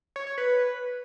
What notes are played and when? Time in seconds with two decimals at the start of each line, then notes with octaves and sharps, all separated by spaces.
0.16 C#5
0.27 C#5
0.38 B4